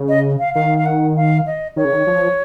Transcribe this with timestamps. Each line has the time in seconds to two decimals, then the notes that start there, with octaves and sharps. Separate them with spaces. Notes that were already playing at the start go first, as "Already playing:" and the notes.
Already playing: C#3
0.09 D#5
0.39 F5
0.54 D#3 F5
0.78 F5
0.86 F#5
1.16 F5
1.47 D#5
1.76 D#3 C#5
1.85 C#3
1.93 D#3
2.07 F3